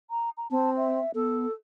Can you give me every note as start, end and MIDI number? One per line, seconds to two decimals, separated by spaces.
0.10 0.30 82
0.37 0.48 82
0.51 1.00 60
0.51 0.70 81
0.77 1.11 76
1.15 1.47 59
1.15 1.52 69